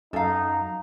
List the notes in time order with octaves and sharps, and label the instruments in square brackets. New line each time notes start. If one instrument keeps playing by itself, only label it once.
[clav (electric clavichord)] F#2 [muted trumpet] D#4 [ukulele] A4 F5 [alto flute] A#5